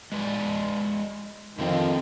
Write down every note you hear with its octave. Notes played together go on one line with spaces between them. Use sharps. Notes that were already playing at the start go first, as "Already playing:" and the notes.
G#3 B4 D5
F2 D3 D#3 F3 A3 C4